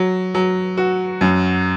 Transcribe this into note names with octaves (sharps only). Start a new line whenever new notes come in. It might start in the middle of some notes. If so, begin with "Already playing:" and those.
Already playing: F#3
F#3
F#4
F#2